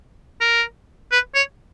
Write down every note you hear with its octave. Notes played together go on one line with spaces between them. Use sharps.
A#4
B4
C#5